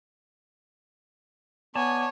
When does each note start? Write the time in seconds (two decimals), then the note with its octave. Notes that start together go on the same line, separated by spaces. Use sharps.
1.75 B3 C#5 D5 G#5 A5